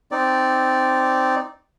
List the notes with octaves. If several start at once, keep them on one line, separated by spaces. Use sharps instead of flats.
C4 D#4 D5